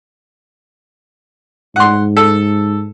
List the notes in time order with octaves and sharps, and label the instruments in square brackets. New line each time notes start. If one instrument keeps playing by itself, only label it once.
[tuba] G#2 [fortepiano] F#5 C6
[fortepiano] A4